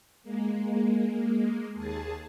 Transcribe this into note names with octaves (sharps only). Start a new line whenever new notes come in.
G#3 A#3
D#2 G#4 A5